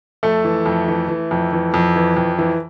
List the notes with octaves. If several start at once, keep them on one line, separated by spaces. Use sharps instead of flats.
F2 A3 A4
E3
F2
E3
E3
F2
E3
F2
E3
F2
E3